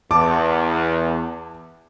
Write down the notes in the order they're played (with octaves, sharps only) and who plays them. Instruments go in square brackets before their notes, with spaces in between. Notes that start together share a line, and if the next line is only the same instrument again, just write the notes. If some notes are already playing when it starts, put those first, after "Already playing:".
[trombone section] E2 [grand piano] A5 D6